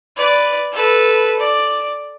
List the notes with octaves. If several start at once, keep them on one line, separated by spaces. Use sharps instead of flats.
B4 D5
A4 B4
D5